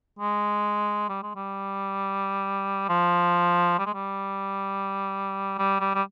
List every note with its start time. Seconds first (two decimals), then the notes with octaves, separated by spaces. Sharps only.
0.19 G#3
1.09 G3
1.23 G#3
1.35 G3
2.89 F3
3.79 G3
3.86 G#3
3.94 G3
5.58 G3
5.80 G3
5.95 G3